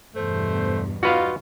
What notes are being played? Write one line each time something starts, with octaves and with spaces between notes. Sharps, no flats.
E2 G2 B2 A3 C5
G3 D#4 F4 F#4 B4 F5